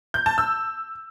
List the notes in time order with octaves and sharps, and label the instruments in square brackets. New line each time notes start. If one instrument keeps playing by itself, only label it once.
[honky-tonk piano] G6
A5
E6